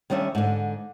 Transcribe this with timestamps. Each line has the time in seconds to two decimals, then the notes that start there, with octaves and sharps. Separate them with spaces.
0.10 D#3 G3 C#4 D4 E5
0.35 G#2 D3